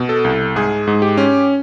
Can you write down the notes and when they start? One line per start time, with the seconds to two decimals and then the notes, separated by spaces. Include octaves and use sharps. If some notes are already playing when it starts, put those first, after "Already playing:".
Already playing: B2
0.09 A4
0.24 C2
0.56 G#2 G#4
0.87 G#2
1.02 G4
1.17 C#4